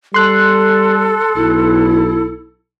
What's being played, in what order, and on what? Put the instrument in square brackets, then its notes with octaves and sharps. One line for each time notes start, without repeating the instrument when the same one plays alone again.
[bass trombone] G3 [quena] A4 [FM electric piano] C6 F#6
[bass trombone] B1 [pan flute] E4